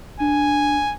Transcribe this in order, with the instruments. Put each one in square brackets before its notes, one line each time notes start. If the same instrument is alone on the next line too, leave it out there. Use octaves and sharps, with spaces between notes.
[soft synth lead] D4 [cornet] G#5